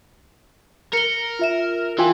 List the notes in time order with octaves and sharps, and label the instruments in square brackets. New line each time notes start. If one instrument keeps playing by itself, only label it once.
[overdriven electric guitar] A#4 [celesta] C#7 G7
[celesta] F4 E5 E7
[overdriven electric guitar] E3 [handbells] F4 G5 G#5